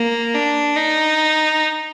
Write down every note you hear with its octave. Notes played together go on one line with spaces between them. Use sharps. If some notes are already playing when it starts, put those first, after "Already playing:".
Already playing: A#3
D4
D#4